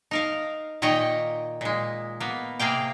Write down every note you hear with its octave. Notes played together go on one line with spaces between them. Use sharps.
D#4 A#4 F5
A#2 D#3 C#5 D#5 G5
A#2 G#3
A#3 B3
C3 A#3 G#4 F5 G5